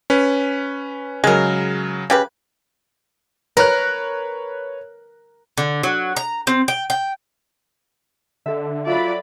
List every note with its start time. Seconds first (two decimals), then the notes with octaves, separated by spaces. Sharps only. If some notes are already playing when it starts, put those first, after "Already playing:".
0.10 C#4 B4
1.24 C#3 F#3 G#3 A#4
2.10 C#3 G4 B4
3.57 A#4 B4 C#5 F#6
5.58 D3
5.83 F#3
6.17 A#5
6.47 C4
6.68 G5
6.90 G5
8.46 D3 A4 E5
8.87 F#3 F4 D5 E5 B5